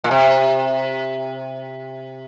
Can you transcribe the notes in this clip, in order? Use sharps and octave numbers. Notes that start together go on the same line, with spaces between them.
A#2
C3